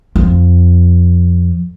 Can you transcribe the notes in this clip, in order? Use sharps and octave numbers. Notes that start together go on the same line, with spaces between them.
F2